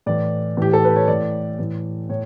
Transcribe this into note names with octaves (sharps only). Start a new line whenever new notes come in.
A2 E3 D5
A2 E3 G4
A4
B4
C#5
A2 E3 D5
A2 E3
A2 C#5